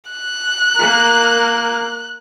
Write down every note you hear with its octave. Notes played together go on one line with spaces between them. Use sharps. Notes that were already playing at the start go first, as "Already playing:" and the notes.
F#6
A#3 A#4